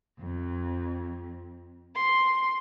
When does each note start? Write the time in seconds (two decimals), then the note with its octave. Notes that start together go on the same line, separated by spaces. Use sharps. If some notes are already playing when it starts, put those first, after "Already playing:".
0.18 F2
1.95 C6